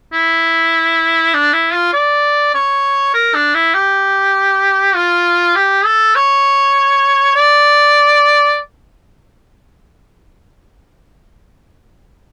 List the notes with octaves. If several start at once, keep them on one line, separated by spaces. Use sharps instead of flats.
E4
D4
E4
F4
D5
C#5
A#4
D4
E4
G4
F4
G4
A4
C#5
D5